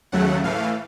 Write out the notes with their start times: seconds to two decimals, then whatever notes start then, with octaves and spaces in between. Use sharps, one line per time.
0.12 D#2 C#3 F#3 A3 F#5
0.43 A2 E3 A3 F5